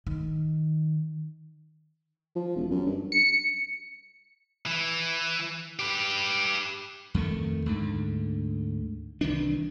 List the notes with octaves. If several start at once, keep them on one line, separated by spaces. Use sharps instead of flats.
D#3
F3
E1
F#2
G2
C#7
E3
G4 B4
F2 D#3 A3
D2 G#2 D3
C2 D#3 E3 D4